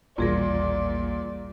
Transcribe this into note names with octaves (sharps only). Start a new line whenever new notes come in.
A1 D#2 A#2 E3 G3 G#4 A#4 D5